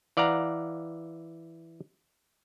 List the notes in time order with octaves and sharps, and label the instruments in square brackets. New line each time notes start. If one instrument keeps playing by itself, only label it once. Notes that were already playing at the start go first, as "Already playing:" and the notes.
[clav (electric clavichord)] E3 D5 F5 F#5 A#5